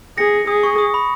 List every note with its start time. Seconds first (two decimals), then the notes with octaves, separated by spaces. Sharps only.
0.18 G#4 A#6 C#7
0.47 G#4 D#6
0.63 C#6
0.78 D#6
0.94 B5